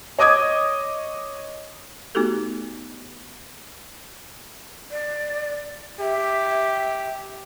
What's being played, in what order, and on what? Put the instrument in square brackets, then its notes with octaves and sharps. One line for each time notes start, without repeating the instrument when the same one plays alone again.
[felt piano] C#5 D#5 D6 D#6 G#6
[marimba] A3 B3 D#4 F#4 G4 A4
[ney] D5
[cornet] G4 [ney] E5